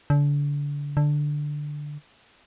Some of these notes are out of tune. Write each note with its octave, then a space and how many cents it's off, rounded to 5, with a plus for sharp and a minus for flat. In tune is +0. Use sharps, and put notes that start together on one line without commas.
D3 -30
D3 +5